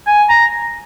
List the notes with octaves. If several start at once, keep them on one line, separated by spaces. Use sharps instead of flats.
G#5
A#5